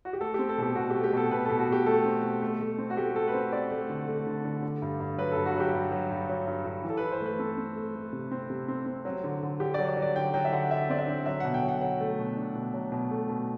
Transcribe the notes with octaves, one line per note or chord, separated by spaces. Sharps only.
F#4
G4
A3 A4
C4 G4
A4
B2 G4
B2 F#4
G4
A3
G4
B2 A4
B2 B4
B2 A4
F#4
B2 G4
A3 A4
C4
B2
A3
A3
C4
F#4
A3 G4
A3 A4
B4
C4 C5
C4 D5
A3
D3
A3
D3
D3
D3
G2
G2
F#3 B4
G2 A4
F#4
F#3 G4
G2
F#3
G2
F#3
G2
G2
E3
A4
B4
E3
C5
A3
B4
C4 A4
C4
A3
A3
C3
C4
C3
C4
C4
F#3
D3
D3
D3 G4
F#3 D5
D5
F#3
D5
D3 G5
F#3 G5
E5
D3 F#5
D3 E5
C4 D5
E5
D3
F#3 E5
B2 F#5
G5
F#3
F#5
F#3 F#5
A3
B2
D4
B2
F#3
B2
A3
B2